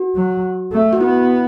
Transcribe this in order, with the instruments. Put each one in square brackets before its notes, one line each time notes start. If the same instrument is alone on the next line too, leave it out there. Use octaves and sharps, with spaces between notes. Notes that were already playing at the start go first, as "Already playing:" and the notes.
Already playing: [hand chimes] F#4
[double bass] F#3
A3
[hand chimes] F#4
[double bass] B3 [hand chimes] E4